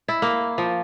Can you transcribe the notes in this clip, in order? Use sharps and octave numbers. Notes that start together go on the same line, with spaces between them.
E4
A#3
F3